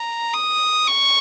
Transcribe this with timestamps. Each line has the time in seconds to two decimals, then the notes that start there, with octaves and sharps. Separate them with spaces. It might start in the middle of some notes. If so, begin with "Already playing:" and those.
Already playing: A#5
0.33 D#6
0.87 C#6